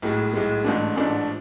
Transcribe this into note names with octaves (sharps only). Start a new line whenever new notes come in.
B1 A2 G#3
B1 A2 G#3
A1 G#2 F3 A3 D4
A1 G#2 F3 A3 D4